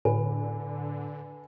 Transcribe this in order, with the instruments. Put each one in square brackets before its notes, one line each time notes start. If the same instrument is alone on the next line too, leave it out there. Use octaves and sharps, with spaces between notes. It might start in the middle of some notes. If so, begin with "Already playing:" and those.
[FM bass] A2 [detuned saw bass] D3 [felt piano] B4 [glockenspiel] G#5